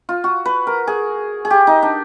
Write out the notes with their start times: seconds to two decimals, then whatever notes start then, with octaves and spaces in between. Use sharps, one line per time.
0.09 F4
0.24 F#4
0.45 B4
0.67 A#4
0.87 G#4
1.45 G#4
1.50 G4
1.67 D#4
1.82 D4